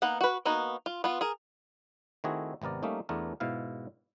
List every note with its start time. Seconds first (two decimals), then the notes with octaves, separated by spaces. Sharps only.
0.02 A#3 B3 D#4 F#5
0.21 F#4 B4
0.45 A#3 B3 D#4 F#4
0.86 F4
1.04 B3 F4
1.21 G#4 A#4
2.24 D#3 A3 C4 E4 F#4 G#4
2.62 G#1 C3 B3 A#4 D5
2.83 G3 A3 A#3 C#4 D#4
3.09 E2 A3 B3 D4 A#4
3.40 G#2 B2 E4 E5 F5